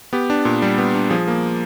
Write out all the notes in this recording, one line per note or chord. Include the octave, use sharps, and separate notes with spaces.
B3 G4
D4
A#2
G3
B3
D4
F3 G#4
A#3